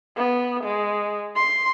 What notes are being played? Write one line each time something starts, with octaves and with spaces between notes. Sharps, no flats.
B3
G#3
C6